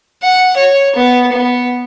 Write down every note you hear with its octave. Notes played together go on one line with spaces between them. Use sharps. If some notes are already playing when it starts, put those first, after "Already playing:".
F#5
C#5
B3
B3